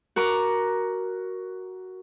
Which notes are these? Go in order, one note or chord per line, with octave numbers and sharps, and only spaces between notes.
F#4 A#4 A#5 D6